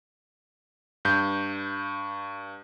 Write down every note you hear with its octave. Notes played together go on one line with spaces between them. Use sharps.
G2 G6